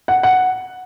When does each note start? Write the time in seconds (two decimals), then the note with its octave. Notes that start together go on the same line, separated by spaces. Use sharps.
0.08 F#5
0.23 F#5